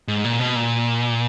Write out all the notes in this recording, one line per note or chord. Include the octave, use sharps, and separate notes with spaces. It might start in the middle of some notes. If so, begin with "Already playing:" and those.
G#2
A#2
B2
A#2